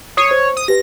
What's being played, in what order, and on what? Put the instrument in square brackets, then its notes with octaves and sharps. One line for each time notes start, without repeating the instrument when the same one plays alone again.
[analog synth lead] C#5 [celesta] D#6 C7 D#7
[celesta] C5
[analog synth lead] D#6
[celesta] G4 B4 [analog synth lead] A#6